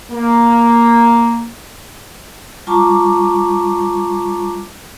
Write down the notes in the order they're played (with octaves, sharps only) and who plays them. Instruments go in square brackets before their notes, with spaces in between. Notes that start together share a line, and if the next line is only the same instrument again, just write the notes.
[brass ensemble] A#3
[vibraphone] G3 F4 A5 A#5 C#6 D6